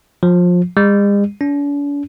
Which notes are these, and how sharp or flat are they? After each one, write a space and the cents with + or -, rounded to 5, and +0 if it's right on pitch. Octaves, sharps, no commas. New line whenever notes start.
F3 +25
G#3 -45
D4 -45